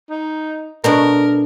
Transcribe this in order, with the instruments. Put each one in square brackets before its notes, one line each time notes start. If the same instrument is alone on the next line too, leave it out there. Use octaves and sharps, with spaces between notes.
[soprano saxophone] D#4
[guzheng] B2 A3 D4 [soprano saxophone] A#4